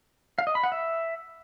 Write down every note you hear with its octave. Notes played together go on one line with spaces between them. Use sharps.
F5
D#5
B5
F#5
E5